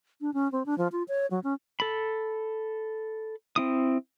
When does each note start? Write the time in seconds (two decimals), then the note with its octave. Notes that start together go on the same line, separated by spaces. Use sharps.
0.21 D4
0.34 C#4
0.52 C4
0.66 D4
0.78 F3
0.92 F4
1.08 C#5
1.31 F#3
1.44 C#4
1.80 A4 B5
3.56 C4 E4 D#6